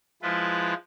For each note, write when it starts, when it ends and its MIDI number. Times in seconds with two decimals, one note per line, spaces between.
0.22 0.74 53
0.22 0.74 56
0.22 0.74 64
0.22 0.74 65
0.22 0.74 71